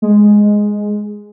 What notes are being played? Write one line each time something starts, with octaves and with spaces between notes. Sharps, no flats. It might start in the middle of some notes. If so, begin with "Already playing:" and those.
G#3